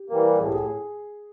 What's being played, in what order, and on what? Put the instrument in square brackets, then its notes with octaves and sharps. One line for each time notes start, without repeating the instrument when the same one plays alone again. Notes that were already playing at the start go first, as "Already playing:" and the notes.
Already playing: [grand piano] G4
[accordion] E3 G3 A#3
[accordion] A2 [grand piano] G#4
[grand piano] G4
G#4